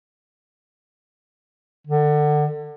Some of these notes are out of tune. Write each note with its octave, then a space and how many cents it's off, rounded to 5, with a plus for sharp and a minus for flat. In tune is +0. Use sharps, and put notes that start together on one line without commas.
D3 +25